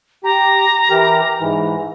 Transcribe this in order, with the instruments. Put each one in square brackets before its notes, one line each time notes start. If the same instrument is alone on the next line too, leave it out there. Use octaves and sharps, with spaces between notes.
[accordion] G4 [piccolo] A#5
[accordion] E3 G4 A#4
G#2 E3